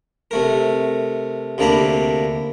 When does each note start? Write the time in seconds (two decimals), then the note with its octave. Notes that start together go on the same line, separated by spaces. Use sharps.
0.31 C3 A3 A#4
1.58 D2 C3 A#3 D4 A#5 B5